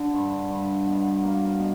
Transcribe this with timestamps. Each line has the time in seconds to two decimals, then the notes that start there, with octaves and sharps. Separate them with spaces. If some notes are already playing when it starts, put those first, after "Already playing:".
Already playing: D3
0.14 G2
0.51 G2
0.87 B2
1.24 A#3
1.59 B2